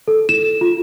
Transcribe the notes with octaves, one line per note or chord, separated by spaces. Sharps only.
A4
E7
F4